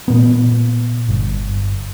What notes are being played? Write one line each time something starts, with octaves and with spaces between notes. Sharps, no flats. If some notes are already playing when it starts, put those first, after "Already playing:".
A#2 B3
G1